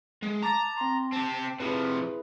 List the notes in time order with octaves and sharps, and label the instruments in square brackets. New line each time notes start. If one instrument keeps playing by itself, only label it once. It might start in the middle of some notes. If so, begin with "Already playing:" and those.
[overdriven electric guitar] G#3
[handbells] A5 D6 A6 [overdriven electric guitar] A#5
[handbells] C4 C6
[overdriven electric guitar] C4 G4 [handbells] A5
[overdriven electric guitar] C3 F3 [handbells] E4 G#4 B4